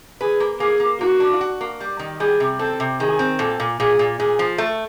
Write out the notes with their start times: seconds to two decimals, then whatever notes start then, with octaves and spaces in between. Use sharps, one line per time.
0.21 G#4 B4
0.40 A#3
0.60 A#3 G#4
0.80 A#3
1.00 A#3 F#4
1.20 D4
1.41 F#4
1.61 A#3
1.81 G3
1.99 D#3
2.20 G3 G#4
2.40 C3
2.59 C4 A4
2.80 C3
3.00 D#3 G#4
3.19 C4
3.39 A#2 A4
3.60 A#2
3.80 A#2 G#4
3.99 A#2
4.19 A#2 G#4
4.39 F3
4.58 A3